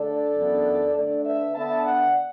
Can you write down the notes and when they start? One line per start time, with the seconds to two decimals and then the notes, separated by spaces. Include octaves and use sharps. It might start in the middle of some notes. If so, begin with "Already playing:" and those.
Already playing: D3 A3 D4 A4 D5
0.37 F#2 E3 B3 D4
0.96 D3 A3 D4 A4 D5
1.25 B4 E5
1.55 D3 B3 D4 E5 A5
1.83 D5 F#5